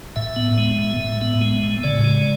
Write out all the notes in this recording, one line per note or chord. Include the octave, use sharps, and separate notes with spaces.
A2 E5
B3
G#3
A2
A2
B3
G#3
A2
C#3 D5
G#3